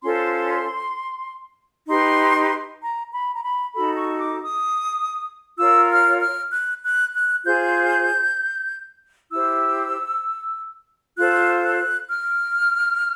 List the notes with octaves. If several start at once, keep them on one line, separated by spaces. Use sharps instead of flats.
C#4 F4 A4 C5 C6
D#4 G4 B4 C6
A#5
B5
A#5
B5
D#4 F#4 A4 B5
C#6
D6
D#6
F4 A#4 C#5 E6
F6
F6
F#6
F#6
F#6
F4 G#4 C5 G6
E4 G4 C5 E6
F4 A4 C5 F#6
F#6
F6